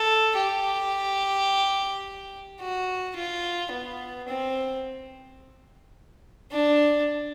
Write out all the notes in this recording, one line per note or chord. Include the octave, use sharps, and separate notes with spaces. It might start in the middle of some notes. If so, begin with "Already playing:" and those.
Already playing: A4
G4
F#4
F4
B3
C4
D4